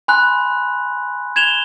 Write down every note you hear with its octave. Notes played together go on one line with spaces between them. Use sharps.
G#5 B5 C6 F#6
G#6 E7 F7 G7